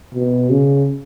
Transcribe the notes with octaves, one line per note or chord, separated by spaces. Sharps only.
B2
C#3